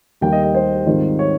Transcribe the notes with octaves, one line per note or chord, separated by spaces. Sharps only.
D#2 D#3 G3 A#3 G5
D#5
D#5
C5
G#2 D#3 G3 C4 F4
C#5